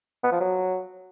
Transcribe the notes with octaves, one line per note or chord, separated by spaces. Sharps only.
B3
F3
F#3